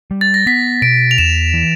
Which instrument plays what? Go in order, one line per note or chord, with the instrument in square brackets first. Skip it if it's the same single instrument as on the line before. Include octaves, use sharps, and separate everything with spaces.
[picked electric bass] G3
[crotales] A6
A#6
[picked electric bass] B3 [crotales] B6
[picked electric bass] B2 [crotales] D7
[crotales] F7
[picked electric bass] E2 [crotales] E7
[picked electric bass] E3